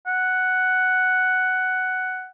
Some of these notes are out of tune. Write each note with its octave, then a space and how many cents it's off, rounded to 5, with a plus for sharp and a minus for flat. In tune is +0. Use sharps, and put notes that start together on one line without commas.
F#5 +5